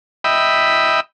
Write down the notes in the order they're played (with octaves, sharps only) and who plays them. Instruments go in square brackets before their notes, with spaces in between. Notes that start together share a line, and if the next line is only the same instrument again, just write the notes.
[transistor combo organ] D#5 E5 G5 B5